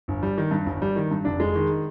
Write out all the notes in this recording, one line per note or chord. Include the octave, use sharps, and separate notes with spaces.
G1
G3
D#3
G2
G1
G3
D#3
G2
F1 D4
G#3
D#3